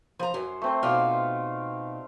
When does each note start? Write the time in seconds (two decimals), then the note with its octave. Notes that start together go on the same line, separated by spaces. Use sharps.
0.19 F3 C5 A#5
0.34 F#2 F#3
0.62 A3 C4 C5
0.83 B2 D#4 F4 D5 F5